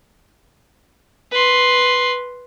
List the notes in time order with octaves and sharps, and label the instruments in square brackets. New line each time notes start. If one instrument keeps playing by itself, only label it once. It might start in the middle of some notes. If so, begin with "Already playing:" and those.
[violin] B4 C6